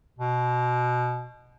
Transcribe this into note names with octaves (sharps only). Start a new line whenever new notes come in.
B2